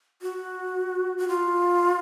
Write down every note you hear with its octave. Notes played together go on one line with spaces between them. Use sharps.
F#4
F#4
F4